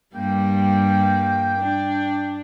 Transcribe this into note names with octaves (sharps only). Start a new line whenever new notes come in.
G2 G3 A#3 G5
D4